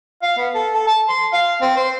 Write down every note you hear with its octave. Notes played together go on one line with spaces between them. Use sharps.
F5
B3
A4
A4
A5
C6
F5
C4
C5